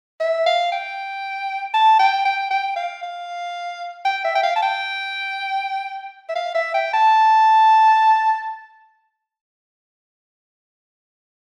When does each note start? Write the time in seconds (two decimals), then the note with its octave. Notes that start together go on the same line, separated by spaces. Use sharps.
0.20 E5
0.46 F5
0.72 G5
1.74 A5
1.99 G5
2.25 G5
2.51 G5
2.76 F5
3.03 F5
4.05 G5
4.24 E5
4.35 G5
4.43 F5
4.56 A5
4.62 G5
6.29 E5
6.35 F5
6.55 E5
6.74 G5
6.93 A5